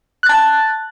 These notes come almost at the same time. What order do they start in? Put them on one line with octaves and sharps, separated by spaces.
F#6 A6 A5